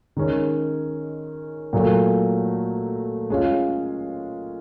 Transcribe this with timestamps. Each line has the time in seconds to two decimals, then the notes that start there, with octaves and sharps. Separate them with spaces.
0.16 D#3 G#3 C#4
1.73 A#2 F#3 A3
3.30 G#3 C#4 F4